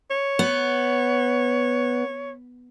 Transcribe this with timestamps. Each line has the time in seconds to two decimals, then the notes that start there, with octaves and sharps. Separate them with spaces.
0.10 C#5
0.39 B3